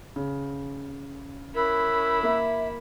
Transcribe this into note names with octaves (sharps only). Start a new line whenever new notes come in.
C#3
C#4 E4 A#4 B5 E6 F#6
A#3 E5